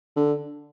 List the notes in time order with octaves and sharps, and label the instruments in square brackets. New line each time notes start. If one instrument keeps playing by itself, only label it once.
[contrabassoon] D3